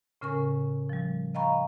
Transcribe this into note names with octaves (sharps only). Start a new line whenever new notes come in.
A2 C#3 C#4 A#4 G#5 C#6
F3 G3
D#5 F5 G5 A#5 B5 C#6